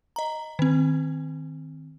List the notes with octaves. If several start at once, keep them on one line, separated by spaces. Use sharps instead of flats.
D#5 A#5
D#3 C4